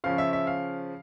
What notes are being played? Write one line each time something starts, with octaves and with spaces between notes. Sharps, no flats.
C#3 F3 C#4 F5
E5
E5
F5